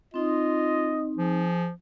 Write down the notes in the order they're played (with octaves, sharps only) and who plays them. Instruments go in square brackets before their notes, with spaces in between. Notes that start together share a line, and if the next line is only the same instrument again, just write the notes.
[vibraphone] C4 D#4 [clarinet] F4 [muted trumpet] D#5
[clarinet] F3 [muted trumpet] G#4